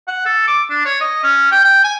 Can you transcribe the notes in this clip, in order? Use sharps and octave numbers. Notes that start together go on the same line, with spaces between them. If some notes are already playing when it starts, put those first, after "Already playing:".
F#5
A4
D6
D4
C#5
D#5
C#4
G5
G5
G#5